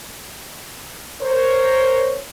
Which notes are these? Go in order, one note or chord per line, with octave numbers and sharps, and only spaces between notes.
A#4 C5 C#5